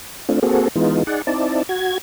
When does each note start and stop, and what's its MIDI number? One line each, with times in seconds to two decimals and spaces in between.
0.29 0.39 57
0.29 0.39 60
0.29 0.39 62
0.29 0.39 65
0.42 0.68 58
0.42 0.68 60
0.42 0.68 66
0.42 0.68 68
0.42 0.68 69
0.76 1.03 52
0.76 1.03 56
0.76 1.03 59
0.76 1.03 63
0.76 1.03 65
1.07 1.22 63
1.07 1.22 68
1.07 1.22 74
1.07 1.22 78
1.27 1.63 60
1.27 1.63 63
1.27 1.63 64
1.27 1.63 74
1.27 1.63 81
1.69 1.98 66
1.69 1.98 92